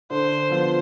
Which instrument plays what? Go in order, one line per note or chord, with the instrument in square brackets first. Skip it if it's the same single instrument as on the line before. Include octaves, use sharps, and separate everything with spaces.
[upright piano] D3 [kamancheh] C5
[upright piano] F3 B3 F4